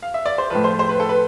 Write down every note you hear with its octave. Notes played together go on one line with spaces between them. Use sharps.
F5
E5
D5
C5
A2 F3 B4
C5
C5
B4
A4
B4